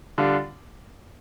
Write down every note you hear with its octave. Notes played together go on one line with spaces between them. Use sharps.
D3 G3 D4 F4